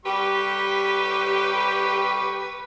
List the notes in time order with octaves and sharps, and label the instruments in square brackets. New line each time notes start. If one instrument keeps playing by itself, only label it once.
[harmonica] G3 C#6 [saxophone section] G4 [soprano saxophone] B4